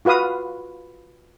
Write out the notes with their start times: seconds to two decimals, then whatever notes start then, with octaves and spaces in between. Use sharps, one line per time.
0.05 F4 F#4 B4 F5 D#6